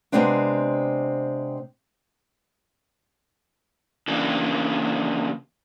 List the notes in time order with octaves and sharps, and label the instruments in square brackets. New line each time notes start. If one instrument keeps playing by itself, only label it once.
[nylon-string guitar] C3 D#3 G#3 B3 C4 D4
[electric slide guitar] C#3 E3 A#3 D4